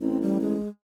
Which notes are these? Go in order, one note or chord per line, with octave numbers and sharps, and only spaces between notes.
A1 C4
G3
G#3